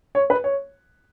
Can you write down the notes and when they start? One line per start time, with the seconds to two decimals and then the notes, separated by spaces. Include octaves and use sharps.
0.15 C#5
0.30 B4
0.44 C#5